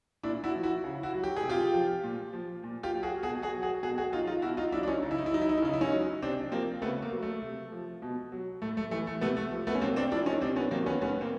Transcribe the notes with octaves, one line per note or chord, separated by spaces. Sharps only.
A#2 D4 E4
E4 F#4
F3
E4 F#4
C#3
E4 F#4
F#3
G4
G#4
C3
F4 G4
F3
A#2
F3
A#2
F4 G4
F#3
F#4 G#4
B2 F#4 G#4
F#4 G#4
F#3
F#4 G#4
B2 F#4 G#4
F#4 G#4
F#3 D#4 F4
D#4 F4
B2 E4 F#4
D#4 F4
F#3 D4 E4
D4
C#4 D#4
C#3 D#4
E4
D#4
E4
F#3 D#4
E4
D#4
E4
C#3 D#4
E4
C#4 D#4
F#3
C3 C4 D4
F3 A#3 C4
C#3 A3 B3
A#3
F#3
A3
C3
F3
B2
F#3
A2 A3
A3
E3 A3
A3
C3 A3 B3
A3
F3
A3 B3
C#4
C3 A#3 C4
C4 D4
F3 D4 E4
C#4 D#4
C3 C4 D4
B3 C#4
D#3 F#3 A#3 C4
B3 C#4
A2 B3 C#4
A#3 C4